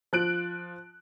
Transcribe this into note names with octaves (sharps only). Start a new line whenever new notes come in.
F3 F#6 D7